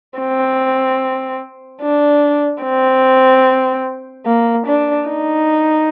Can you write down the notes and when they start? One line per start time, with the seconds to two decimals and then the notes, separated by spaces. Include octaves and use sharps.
0.19 C4
1.82 D4
2.63 C4
4.26 A#3
4.66 D4
5.07 D#4